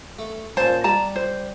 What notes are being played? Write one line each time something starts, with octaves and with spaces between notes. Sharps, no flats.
A3
A#2 C#4 C5 G#5 A5
G3 A5 A#5
C5